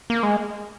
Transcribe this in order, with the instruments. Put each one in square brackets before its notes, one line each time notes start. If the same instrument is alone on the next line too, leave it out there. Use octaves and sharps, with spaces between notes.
[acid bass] A#3
G#3